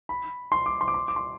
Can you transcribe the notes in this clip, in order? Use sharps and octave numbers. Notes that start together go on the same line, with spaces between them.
B5
C6
D6
C6
D6
C6
D6
C6